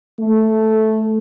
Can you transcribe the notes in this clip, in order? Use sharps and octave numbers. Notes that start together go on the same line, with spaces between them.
A3